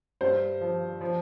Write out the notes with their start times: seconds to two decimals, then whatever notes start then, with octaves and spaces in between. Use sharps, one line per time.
0.21 G2 C5
0.61 F3
1.01 F3